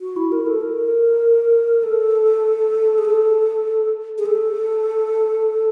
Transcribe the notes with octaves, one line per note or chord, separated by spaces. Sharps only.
F#4
E4
A#4
A4
A#4
A4
G#4
A4
G#4
A4